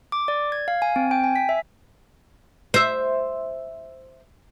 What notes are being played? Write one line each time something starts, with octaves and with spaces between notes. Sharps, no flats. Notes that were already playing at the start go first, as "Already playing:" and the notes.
D6
D5
G#6
F5
G#5
C4
G5
G#5
B6
E5
C5 E5